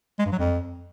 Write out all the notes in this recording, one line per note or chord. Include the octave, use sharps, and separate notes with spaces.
G#3
G2
F#3
F2